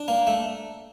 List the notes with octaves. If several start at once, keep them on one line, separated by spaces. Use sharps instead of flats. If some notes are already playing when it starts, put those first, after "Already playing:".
Already playing: D4
A#3
A3